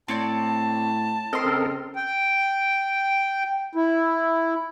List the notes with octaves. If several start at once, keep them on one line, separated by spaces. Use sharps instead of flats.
A2 C4 C#5 D5 A5
C4 A4 A#4 D#5 C6
C#3
G5
E4